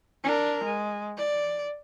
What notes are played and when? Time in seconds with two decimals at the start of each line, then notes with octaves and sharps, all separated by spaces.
0.24 D4 A#4
0.64 G#3
1.18 D5